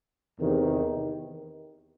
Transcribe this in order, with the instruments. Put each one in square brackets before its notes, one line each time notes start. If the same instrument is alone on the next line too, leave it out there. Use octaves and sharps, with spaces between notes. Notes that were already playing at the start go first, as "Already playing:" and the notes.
[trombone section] E2 C3 D#3